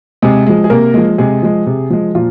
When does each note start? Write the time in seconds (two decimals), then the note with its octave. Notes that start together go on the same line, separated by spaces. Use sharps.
0.22 C3 G#3 G#4
0.47 F3 G#3
0.64 G#4
0.70 C3 A#3 A#4
0.94 F3 G#3
1.18 C3 G#3 G#4
1.43 F3 G#3
1.66 C3
1.90 F3 G#3
2.15 A#2 F3 F4